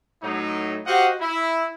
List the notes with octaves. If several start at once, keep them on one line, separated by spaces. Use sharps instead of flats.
A2 F#3 D#4
F#4 G4 C5 D#5 F5 F#5
E4